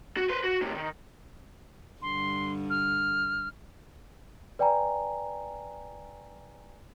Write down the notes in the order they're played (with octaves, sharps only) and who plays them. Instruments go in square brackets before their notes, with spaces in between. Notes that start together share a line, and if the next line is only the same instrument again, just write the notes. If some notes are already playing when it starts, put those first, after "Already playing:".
[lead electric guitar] F#4
B4 C5
F#4
A2 C3
D#3
[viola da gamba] G2 D3 [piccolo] C6
[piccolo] F6
[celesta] B4 D5 G5 G#5 A#5